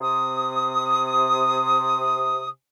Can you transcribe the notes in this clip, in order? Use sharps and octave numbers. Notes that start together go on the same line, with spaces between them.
C3 D#6